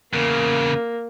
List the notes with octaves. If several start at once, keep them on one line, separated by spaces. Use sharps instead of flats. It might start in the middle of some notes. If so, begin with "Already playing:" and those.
E2 C#3 A#3